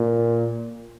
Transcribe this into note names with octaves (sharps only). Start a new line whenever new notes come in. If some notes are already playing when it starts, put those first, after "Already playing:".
Already playing: A#2